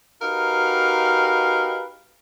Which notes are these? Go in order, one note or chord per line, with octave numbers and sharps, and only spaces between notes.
D#4 F#4 G4 A#4 B4 F5